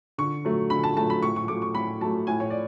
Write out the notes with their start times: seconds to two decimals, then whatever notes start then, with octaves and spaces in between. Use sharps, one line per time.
0.18 D3 C#6
0.45 F#3 A3
0.70 D3 B5
0.84 A5
0.96 F#3 A3 A5
1.10 B5
1.22 A2 C#6
1.36 C#6
1.48 F#3 A3 D6
1.62 C#6
1.75 A2 B5
2.01 F#3 A3 A5
2.27 A2 G#5
2.40 C#5
2.50 D5